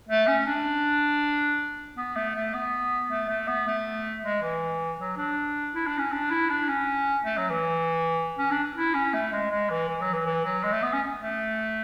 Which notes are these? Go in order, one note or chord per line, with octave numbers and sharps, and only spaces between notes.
A3
C#4
D4
B3
A3
A3
B3
A3
A3
B3
A3
G#3
E3
F#3
D4
E4
D4
C#4
D4
E4
D4
C#4
A3
F#3
E3
C#4
D4
E4
C#4
A3
G#3
G#3
E3
E3
F#3
E3
E3
F#3
G#3
A3
B3
C#4
A3